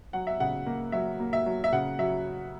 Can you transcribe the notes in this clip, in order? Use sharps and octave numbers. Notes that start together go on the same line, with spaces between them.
F#3 F#5
E5
C#3 F#5
A#3
F#3 E5
A#3
E5
F#3
E5
C#3 F#5
F#3 E5